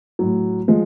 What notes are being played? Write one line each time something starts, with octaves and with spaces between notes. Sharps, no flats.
A2 F#3
F3 G#3